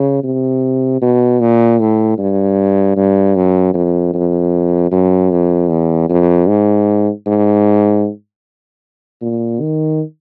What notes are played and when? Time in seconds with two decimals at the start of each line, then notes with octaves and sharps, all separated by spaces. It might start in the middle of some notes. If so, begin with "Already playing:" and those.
Already playing: C#3
0.23 C3
1.01 B2
1.40 A#2
1.79 A2
2.18 G2
2.96 G2
3.36 F#2
3.74 F2
4.14 F2
4.91 F#2
5.31 F2
5.70 E2
6.09 F2
6.48 G#2
7.26 G#2
9.21 A#2
9.61 D#3